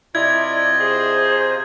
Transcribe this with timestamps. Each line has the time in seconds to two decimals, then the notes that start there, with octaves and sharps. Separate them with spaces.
0.15 C3 E4 F4 D5 D#5 G#6
0.80 G#4 C5